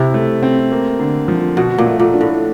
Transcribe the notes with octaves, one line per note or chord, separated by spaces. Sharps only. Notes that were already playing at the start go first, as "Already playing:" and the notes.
Already playing: C3 E4
A3
C4
A#3
D3
F3
B2 F#4
A#2
A3
A#2
D4
A2